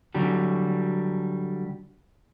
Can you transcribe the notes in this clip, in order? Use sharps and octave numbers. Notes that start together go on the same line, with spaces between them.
D3 F#3 G3